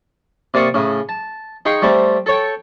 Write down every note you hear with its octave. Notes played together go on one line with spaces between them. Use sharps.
C3 A#3 D5 F5 C#6 D#6
A2 C#3
A5
D#4 G#4 F5 G5 C6 C#6
G3 A3 C4
A4 C#5 G5